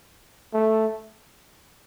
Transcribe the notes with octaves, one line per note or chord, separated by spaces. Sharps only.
A3